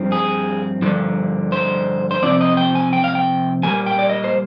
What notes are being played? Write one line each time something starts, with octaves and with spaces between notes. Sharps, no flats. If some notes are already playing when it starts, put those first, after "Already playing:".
Already playing: G2 F3 C4
G#4
G2 D3 F3
C5
C5
C3 F3 C4 D5
D#5
G5
G#5
G5
F5
G5
A#2 G3 A#3 G#5
G5
D5
D#5
C5